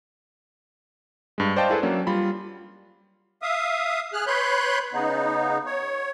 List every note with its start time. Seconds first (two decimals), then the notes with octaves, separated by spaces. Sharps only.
1.38 G2 G#3
1.56 C5 D5 D#5 F5 G5 A5
1.70 E4 G#4 A4 B4
1.82 F#3 A#3 C#4 D4
2.07 G3 F4 B5
3.42 E5 F5 D#6
4.13 G#4 F6 F#6
4.27 B4 C#5 B5 C6 F#6 G6
4.93 C#3 B3 D#4
5.66 C#5